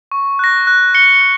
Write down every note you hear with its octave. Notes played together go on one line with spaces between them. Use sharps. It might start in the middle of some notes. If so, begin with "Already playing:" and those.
C#6
F#6 A#6
F#6
C#7 G7
F#6